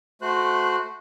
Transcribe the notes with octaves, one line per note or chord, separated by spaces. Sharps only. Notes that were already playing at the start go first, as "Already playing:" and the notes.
A3 F#4 C5 F#6